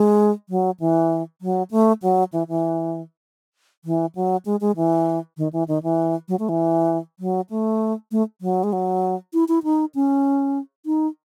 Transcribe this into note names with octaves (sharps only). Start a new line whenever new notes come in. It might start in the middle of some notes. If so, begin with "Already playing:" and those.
Already playing: G#3
F#3
E3
F#3
A3
F#3
E3
E3
E3
F#3
G#3
G#3
E3
D#3
E3
D#3
E3
F#3
A3
E3
F#3
A3
A3
F#3
G#3
F#3
E4
E4
D#4
C#4
D#4